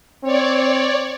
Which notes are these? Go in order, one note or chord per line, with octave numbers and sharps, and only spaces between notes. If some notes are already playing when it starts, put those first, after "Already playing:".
C4 C#5 D5